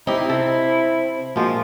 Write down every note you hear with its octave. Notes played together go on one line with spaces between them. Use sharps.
C4 D#4 E4 G4
C3 A4
A#1 A#2 F3 G#3 A#3 F#4